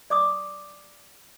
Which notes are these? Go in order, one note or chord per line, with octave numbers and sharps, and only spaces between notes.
D5 D6 D#6